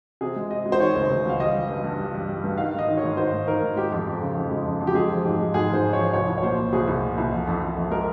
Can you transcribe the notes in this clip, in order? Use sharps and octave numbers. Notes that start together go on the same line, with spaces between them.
C3 G#4
G#3
C3 D#5
G#3
C5
D#3 C#5
C#2
C#2
C#2 F5
G3 D#5
G3
G2
G2
G3
G3
G3
G2
D#3 F5
G#2
D#5
D#3
C#5
G#2
D#3 C5
G#2
D#3 A#4
G#2
G#3 G4
F2
F2
C#3
F2
G#3
F2
F2
G4
G#3 G#4
F3
G#2 G4
G#3
G#2 G#4
G#2 C5
G#2
C#5
F3
C2 C#5
C2
C#5
A#2 C5
C2
C2 G#4
C2
A#2
C2
F2
F2
F2
F2
G#3 A#4